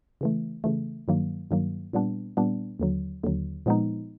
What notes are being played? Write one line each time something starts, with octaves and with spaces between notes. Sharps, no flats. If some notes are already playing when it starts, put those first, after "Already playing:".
C#3 E3 A3
C#3 E3 A3
G2 D#3 F#3 A#3
G2 D#3 F#3 A#3
A#2 G3 B3 D4
A#2 G3 B3 D4
D#2 D3 F#3
D#2 D3 F#3
A#2 F3 G#3 B3 D#4